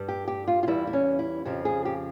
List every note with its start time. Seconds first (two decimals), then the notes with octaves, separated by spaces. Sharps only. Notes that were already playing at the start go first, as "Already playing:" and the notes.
Already playing: G2 G3
0.09 G4
0.28 G4
0.47 F4
0.63 F4
0.67 E2 E3 G3 E4
0.87 E4
0.93 C#4
1.19 E4
1.45 F2 C#3 F3 G4
1.65 G#4
1.85 G4